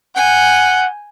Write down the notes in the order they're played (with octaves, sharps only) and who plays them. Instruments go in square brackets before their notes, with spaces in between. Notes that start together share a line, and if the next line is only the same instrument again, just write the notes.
[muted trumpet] F#5 [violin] G#5 G6